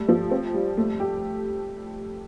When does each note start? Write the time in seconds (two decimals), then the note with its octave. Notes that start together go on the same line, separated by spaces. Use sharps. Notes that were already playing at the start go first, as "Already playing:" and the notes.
Already playing: G3 A3
0.08 F3
0.31 C4
0.54 G3
0.77 A3
1.00 G4